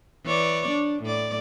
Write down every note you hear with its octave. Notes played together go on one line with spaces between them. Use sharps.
E3 C#5 D5
D4
A2 D5